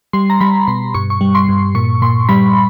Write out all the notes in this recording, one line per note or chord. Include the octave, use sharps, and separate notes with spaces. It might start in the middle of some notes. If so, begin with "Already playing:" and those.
G3 C6
A#5
G3 B5
B2 C6
G2 C#6
C#6
G3
C6
G2
A#2 C#6
A#2 C6
G3 B5